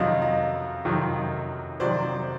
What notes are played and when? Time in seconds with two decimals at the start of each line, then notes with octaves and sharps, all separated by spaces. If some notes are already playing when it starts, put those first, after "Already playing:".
Already playing: F2 C3 D#3 F#3 D#5 F5
0.22 D#5 F5
0.85 F2 C3 D#3 F#3
1.80 F2 C3 D#3 F#3 C5 D5